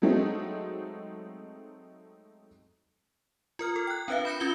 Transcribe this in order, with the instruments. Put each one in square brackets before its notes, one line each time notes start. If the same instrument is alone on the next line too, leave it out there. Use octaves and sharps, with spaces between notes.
[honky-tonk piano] F#3 G#3 A3 C4 D#4
[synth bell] F4 A#4 F6
A4
G5 F#6
C4 D4 B4 E5 F5
B5 G6 A#6 C#7
C#4 F4 D#6 C#7 G7